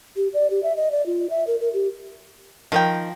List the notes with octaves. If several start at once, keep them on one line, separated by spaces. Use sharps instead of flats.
G4
D5
G4
E5
D#5
D5
F4
E5
A#4
A#4
G4
D#3 F3 A#4 G5